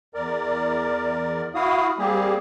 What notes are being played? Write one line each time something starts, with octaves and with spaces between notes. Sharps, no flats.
E2 A#4 D5
E4 F#4 F5 D#6
G3 A#3 C4 G4 G#4